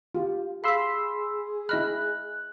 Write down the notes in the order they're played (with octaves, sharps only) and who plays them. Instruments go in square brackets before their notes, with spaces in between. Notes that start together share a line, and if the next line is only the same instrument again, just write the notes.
[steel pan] F4 G4
[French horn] G#4 [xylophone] F5 B6 [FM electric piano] B5 C6 E6
[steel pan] E4 B5 [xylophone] D#5 F6 [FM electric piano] F#6